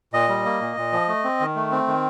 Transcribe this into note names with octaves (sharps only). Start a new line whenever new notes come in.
A#2 D#5
G3
A#3
A#2
A#2
F3
A3
C4
D#3
A3
C4
D#3